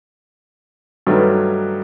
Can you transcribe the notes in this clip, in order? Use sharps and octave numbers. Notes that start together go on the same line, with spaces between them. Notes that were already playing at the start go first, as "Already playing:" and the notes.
G2 D#3 F#3 A3 B4